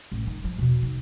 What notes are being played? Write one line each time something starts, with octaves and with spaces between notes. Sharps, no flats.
A1
D#3
F3
E2 B2
D#3